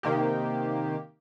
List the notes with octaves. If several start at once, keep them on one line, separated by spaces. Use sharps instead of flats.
C3 D#3 A#3 G4